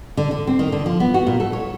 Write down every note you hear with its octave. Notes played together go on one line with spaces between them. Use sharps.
D3
D3
C4
D#3
D3
F3
B3
F#4
A#2
A4
C#5